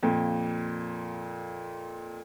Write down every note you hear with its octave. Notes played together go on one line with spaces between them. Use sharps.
F2 A#2